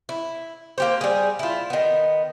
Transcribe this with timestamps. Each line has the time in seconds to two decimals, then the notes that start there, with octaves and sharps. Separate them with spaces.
0.09 E4
0.78 A#3 G4 C5
1.01 G3 G#4
1.39 E4 F4
1.70 D#3 B3